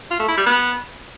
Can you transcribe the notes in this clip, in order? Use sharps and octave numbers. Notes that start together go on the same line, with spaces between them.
F4
A3
E4
G3
B3